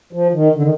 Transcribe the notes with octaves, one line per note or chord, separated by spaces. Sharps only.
F3
D#3
D3
D#3